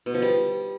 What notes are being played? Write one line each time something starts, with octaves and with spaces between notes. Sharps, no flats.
B2
F3
G3